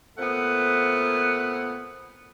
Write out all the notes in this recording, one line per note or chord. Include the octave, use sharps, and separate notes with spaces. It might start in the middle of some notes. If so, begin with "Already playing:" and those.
A#2 A3 B3 C4 F#5